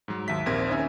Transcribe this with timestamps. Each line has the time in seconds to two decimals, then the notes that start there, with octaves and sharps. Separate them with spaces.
0.08 G#2 F#3
0.28 D#2 E5 B6
0.46 A#1 D#2 C4 A#4 G#6
0.69 C#4 D#4 E5 G#5